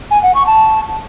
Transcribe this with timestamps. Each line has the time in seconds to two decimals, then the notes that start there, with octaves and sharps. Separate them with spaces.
0.11 G#5
0.23 F#5
0.35 C#6
0.47 A5